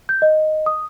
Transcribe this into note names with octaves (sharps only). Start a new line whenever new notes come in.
G6
D#5
D#6